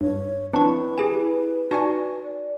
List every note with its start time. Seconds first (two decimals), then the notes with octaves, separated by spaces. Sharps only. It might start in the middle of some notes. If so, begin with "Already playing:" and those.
0.01 G2 C#5
0.53 F3 C4 D4 E4 B4 C#6
0.98 G4 G#4 G#5 E7
1.71 D#4 F#4 D5 G#5 A5 C#6 A#6